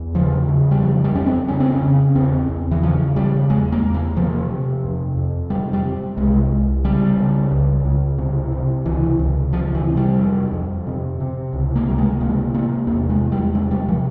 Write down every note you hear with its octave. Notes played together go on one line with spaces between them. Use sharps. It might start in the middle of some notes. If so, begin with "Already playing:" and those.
Already playing: E2
C#3 F3
C#3
G3
F2 F3
G3
F2 C#4
C4
C#3 C#4
C4
C#4
C#3
E2 C4
E2
E3
C#3 F3
C#3 G3
E2 G#3
A#3
E2
A#3
C3 F3
C3
F2
F2
C3 G3
G3
C3
C2 G#3
C2
C#3 G3
C#3
C#2
C#2
C3
C3
C#2 E3
C#2
C3 F3
E3
C3
G3
F2
F2
C3
C3
C#2
A#3
C#2 G3
G#3
C3 A#3
C3 A#3
E2 A#3
G#3
E2
G3
C3 G#3
G3
C3 F3